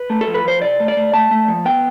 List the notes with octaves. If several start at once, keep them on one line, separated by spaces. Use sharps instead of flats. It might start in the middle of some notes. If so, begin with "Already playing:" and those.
Already playing: B4
A3
A4
F3
B4
F3 C5
C3 D5
A3
D5
A3
A3 A5
A3
F3
B3 G5